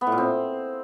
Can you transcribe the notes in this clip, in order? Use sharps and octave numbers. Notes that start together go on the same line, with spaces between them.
B3
A2
A#2
C4